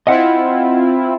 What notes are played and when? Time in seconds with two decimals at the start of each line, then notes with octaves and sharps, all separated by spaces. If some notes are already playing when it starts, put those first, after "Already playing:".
0.07 C4 E4 F4 D#5 F5 F#5